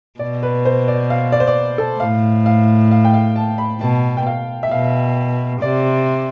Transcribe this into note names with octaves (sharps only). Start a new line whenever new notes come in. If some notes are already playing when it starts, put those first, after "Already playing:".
B2 D5
B4
C5
D5
F5
D5
C5
D5
A4
A2 F5
F5
F5
G5
F5
A5
B5
B2 A5
G5
F5
E5
B2 F5
C3 D5